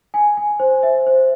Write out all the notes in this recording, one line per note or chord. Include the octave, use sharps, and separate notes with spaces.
G#5
G#5
C5
E5
C5